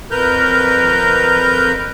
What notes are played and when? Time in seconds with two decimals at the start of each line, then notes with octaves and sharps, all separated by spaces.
0.11 F2 A#4 B4 A#5 G6